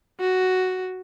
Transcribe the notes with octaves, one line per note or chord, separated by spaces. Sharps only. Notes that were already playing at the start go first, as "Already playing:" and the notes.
F#4